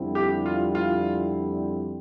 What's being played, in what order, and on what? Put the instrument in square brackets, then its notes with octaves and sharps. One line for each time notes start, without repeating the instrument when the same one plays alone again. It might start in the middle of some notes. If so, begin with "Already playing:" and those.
Already playing: [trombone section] F2 D3 G3 C4 E4
[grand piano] G4
F4
F4